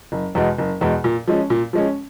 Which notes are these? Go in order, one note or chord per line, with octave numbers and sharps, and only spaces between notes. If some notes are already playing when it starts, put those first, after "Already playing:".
F#1
E2 B2 G#3
F#1
E2 B2 G#3
A#2
F3 G#3 C#4
A#2
F3 G#3 C#4